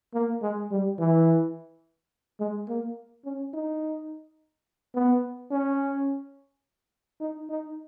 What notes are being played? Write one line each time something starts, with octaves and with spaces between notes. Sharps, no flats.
A#3
G#3
G3
E3
G#3
A#3
C#4
D#4
B3
C#4
D#4
D#4